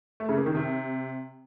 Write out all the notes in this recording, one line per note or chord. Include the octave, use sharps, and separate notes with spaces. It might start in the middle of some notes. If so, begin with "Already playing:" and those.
A3
C#3
A#3
D#3
C3